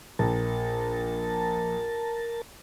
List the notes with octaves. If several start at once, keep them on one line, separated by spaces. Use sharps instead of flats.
A#1 A#4 A5